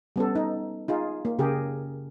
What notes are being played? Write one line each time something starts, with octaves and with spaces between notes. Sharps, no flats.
G3 B3 C#4 A4
D#4
D#4 F4 G#4
A#3
C#3 G4 G#4 A#4